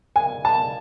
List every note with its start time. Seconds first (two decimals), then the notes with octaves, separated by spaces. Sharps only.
0.16 G#5
0.45 A5